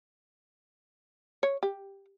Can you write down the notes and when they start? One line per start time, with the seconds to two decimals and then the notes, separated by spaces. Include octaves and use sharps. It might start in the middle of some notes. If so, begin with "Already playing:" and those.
1.43 C#5
1.63 G4